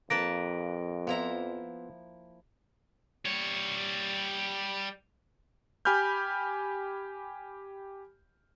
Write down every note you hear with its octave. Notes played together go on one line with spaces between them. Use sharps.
F2 A#3 B4 A5 A#6 D7
F3 B3 E4 F4 E5 A#5
G3 C#5
G4 G#5 B5 F6 G6